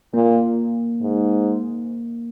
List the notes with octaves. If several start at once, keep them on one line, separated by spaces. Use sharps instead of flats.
A#2 A#3
G#2